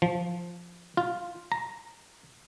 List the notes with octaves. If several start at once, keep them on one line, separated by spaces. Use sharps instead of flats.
F3
F4
A#5